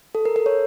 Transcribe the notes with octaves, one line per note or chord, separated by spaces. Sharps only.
A4
A#4
A4 A#4
C#5